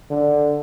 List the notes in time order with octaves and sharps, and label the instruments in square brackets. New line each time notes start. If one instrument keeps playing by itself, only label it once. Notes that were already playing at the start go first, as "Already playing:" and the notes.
[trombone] D3